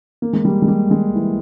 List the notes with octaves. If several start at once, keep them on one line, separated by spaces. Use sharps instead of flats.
A#3
G#3
G3
G#3
G3
G#3
E3